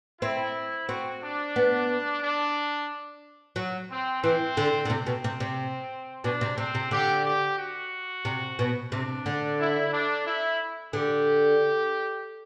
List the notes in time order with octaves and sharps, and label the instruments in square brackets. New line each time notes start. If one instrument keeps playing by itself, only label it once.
[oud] C4 [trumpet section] E4
[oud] C4 [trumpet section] F#4
[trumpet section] D4
[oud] B3
[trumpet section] D4
[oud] F#3
[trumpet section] C4
[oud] E3 [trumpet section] C4
[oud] D3
D3
[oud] C3 [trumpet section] C4
[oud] B2
C3
C3
[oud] B2 [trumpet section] D4
[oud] C3
[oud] C3 [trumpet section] C4
[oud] C3
[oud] D3 [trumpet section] G4
[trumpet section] G4
F#4
[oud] C3
B2
[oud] C3 [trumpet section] D4
[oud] D3
[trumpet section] E4
D4
E4
[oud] D3 [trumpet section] G4